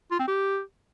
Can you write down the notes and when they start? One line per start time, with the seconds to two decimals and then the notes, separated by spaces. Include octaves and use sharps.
0.11 F4
0.19 C4
0.28 G4